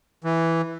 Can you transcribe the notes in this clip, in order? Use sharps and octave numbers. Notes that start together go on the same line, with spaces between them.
E3